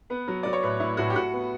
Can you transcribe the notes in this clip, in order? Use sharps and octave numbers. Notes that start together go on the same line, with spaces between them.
B3 B4
F#3
F#3 D5
C#5
A2 B4
A2 E4
A2 F#4
G4
A2 F#4
B3